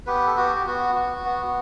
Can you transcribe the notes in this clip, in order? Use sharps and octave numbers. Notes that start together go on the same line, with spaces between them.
B3 G4 B4
A4
F#4 G4
G4
B3 F#4
F#4
B3